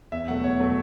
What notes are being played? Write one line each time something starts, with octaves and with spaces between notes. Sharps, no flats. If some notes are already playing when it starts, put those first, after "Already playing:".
E2 E5
B2 F#3 A3 F#5
E2 C#5
B2 F#3 A3